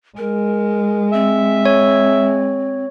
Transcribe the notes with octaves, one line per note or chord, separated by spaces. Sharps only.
G#3 A#4
C4 E5
C#5